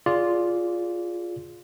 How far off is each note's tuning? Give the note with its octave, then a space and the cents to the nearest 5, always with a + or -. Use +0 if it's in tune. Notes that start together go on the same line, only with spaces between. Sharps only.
F4 +0 G#4 +0 D5 -15